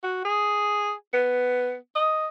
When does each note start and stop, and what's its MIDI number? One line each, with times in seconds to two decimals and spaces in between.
0.03 0.22 66
0.25 0.92 68
1.13 1.75 59
1.95 2.27 75